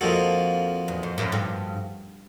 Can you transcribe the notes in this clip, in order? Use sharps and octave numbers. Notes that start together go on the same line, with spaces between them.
F2 F3 A#3 D#4 F#4 A4
E2
F2
F#2
G2